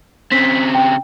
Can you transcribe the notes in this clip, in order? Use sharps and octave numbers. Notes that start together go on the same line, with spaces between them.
C#3 C4 B6
G5